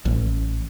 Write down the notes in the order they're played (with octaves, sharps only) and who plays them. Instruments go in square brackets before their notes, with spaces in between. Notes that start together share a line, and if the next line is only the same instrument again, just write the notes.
[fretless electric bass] A1